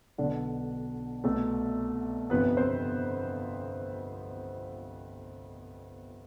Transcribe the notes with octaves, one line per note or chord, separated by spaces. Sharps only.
B1 B2 D3 D4
C2 B2 A3 A4
G1 F2 C3 F3 B3 B4
C4 C5